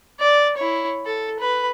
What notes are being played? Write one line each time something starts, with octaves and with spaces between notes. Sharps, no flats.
D5
E4 C#5
A4
B4